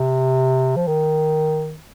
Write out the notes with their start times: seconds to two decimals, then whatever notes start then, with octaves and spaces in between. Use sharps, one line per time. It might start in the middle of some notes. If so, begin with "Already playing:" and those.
Already playing: C3
0.76 F3
0.87 D#3